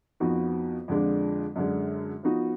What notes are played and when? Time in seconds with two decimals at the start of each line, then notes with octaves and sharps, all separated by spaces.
0.20 F2 F3 B3 D#4 F#4
0.88 F2 D3 F3 G#3 D4
1.56 F#2 D3 G#3
2.23 F3 B3 D#4 F#4